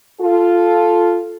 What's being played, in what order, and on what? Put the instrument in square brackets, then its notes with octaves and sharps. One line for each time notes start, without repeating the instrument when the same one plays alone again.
[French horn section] F4 A4